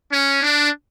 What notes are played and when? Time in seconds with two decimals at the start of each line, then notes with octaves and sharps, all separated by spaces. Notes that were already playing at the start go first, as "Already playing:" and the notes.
0.12 C#4
0.42 D4